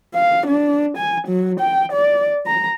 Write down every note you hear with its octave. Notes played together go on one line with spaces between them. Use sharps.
F5
D4
G#5
F#3
G5
D5
A#5